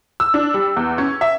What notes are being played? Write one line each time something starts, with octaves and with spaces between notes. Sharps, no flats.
E6
D4
G3
E2
C#4
E5